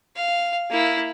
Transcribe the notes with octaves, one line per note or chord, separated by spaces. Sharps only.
F5
A#3 E4